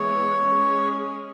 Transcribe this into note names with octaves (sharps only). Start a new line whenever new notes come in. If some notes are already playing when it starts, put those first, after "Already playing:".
Already playing: E3 G#3 B3 G#4 C#5
G#3 C#4 G#4